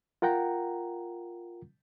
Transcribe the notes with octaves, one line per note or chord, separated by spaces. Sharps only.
F4 A#4 F#5 G5 A#5